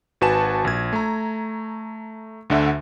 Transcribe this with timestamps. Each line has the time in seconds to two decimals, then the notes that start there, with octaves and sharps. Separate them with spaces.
0.21 G#1 F#4 B4 G#5 A5 E7
0.65 A#1 G#6
0.93 A3 A#5
2.50 D2 D3 E5 F#5